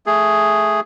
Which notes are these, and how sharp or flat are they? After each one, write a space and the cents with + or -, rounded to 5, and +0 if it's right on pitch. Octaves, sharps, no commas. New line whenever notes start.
A3 +0 G#4 +0